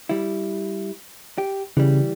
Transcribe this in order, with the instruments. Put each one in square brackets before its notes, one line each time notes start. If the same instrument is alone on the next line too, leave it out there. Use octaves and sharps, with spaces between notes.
[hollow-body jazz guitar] G3 E4
G4
[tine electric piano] C#3 [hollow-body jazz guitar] E3 G3